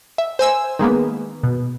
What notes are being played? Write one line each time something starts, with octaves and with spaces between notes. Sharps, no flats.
E5
C5 G#5 E6
D#3 G#3 A#3 B3
B2